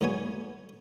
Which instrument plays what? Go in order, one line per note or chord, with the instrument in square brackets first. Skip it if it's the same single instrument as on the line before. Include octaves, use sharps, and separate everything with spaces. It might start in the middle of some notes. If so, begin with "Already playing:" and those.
[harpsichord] G#2 D3 F#3 B3 C#5 G#5